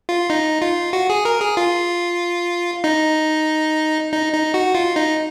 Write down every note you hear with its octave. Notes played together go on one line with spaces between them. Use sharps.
F4
D#4
F4
F#4
G#4
A#4
G#4
F4
D#4
D#4
D#4
F#4
F4
D#4